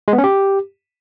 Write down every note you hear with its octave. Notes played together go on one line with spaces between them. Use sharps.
G#3
B3
C#4
G4